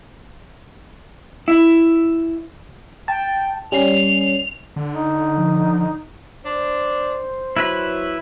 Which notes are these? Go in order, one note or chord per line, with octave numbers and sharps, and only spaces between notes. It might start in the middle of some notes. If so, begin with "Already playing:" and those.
E4
G5 A5
G3 C#4 C7 F7
D3
D#4
F3
D4 C5
F#3 E4 B4 B5